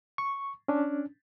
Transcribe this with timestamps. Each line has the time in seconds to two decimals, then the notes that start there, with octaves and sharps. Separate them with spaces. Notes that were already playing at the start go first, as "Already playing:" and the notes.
0.18 C#6
0.68 C#4 D4